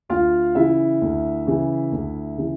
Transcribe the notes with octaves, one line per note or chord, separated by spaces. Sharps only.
D2 F4 F5
C#3 E3 E4 E5
D2
C#3 E3
D2
C#3 E3